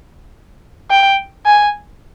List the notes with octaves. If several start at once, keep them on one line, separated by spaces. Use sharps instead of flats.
G5
G#5